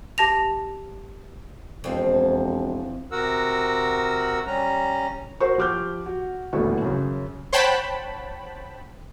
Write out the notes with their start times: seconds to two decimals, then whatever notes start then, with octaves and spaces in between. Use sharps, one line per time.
0.18 G4 A5 A#6 F7
1.84 E1 F2 C4
3.12 C3 F#4 A#4 F#5 E6
4.47 G3 C#4 A#5
5.40 F#4 A#4 C5 C#6
5.58 F3 G4 D6 F6 G6
6.06 F#4
6.53 D#1 A1 D2 A2 B3 C#6
6.82 F#2 C#3
7.53 C5 C#5 F#5 G5 A5 B5